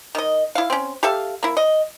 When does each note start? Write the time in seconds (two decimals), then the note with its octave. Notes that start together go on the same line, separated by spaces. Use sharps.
0.15 D#3 D#5
0.55 E4 F5
0.70 C4 C#4
1.03 G4 A4 E5 F5
1.43 A#3 E4
1.57 D#5